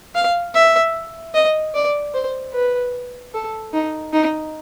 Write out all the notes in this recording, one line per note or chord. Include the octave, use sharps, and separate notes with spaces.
F5
E5
D#5
D5
C5
B4
A4
D#4
D#4